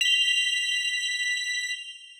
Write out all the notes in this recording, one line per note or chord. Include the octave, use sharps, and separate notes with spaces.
B6 F7 G7